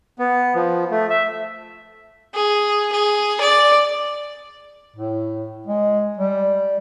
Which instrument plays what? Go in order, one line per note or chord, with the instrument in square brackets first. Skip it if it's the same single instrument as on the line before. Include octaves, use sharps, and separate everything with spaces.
[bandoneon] B3
F3
A3
E5
[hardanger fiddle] G#4
G#4
D5
[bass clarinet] A2
G#3
G3